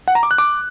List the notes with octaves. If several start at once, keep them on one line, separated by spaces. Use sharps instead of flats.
F#5
A#5
D6
F#6
D6